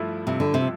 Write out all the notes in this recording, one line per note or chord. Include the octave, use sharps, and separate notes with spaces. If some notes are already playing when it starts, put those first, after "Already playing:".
Already playing: G2 F3 A3 E4
G2 C3
D3
C3
F3